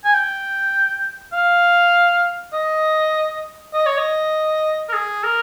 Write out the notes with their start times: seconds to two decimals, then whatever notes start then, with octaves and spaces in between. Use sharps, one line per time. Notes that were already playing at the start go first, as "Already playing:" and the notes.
0.05 G#5
0.14 G5
1.33 F5
2.53 D#5
3.74 D#5
3.86 C#5
3.98 D#5
4.89 A#4
4.93 G#4
5.24 A#4